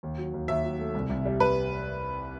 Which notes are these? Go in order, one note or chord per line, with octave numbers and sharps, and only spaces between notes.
D#2
F#3
D#2
D#2 E5
F#3
A3
C2
C2
G3
G3 B4